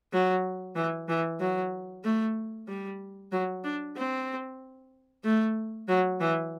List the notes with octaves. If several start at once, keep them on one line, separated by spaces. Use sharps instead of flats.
F#3
E3
E3
F#3
A3
G3
F#3
D4
C4
A3
F#3
E3